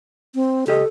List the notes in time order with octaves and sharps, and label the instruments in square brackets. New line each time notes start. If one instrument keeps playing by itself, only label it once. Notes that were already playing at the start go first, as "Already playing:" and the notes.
[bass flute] C4
[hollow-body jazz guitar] C#2 G4 D#5 [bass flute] A4